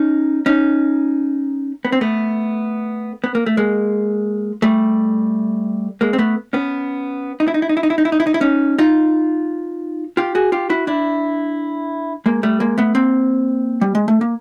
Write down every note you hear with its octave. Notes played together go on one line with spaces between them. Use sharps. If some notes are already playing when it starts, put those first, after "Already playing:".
Already playing: C#4 D#4
C#4 D#4
B3
C4
A3 B3
B3
A#3
A3
G#3 A#3
G3 A3
G#3 A#3
C4
A3 B3
B3 C#4
D#4
E4
D#4
E4
D#4
E4
D#4
E4
D#4
E4
D#4
E4
D#4
E4
C#4 D#4
D#4 F4
F4 G4
F#4 G#4
F4 G4
E4 F#4
D4 E4
G#3 A#3
G3 A3
G#3 A#3
A3 B3
A#3 C4
G3
G#3
A3
A#3